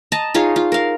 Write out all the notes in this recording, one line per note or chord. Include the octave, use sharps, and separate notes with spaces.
D#5 A5 A#5
D#4 F4 G#4 C#5
F4
A#4 F5